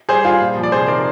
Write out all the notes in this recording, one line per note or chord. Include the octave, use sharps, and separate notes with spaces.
G3 G#4 C5
G3 F4 G#4
A#2
F3
D5
C3 G#4 C5
D#3 A#4 D5